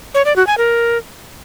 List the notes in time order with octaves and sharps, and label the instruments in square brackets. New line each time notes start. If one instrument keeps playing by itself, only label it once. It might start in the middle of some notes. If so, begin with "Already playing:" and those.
[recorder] C#5
D5
F#4
G#5
A#4